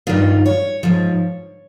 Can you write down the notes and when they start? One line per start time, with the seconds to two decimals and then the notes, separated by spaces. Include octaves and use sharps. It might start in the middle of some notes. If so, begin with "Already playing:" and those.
0.07 G2 D#3 F4
0.46 C#5
0.83 G#2 F3